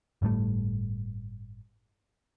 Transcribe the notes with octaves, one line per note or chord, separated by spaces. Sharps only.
G1 A2 G3 A3